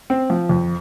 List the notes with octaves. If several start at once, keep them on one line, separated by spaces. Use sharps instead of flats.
C4
F3
F2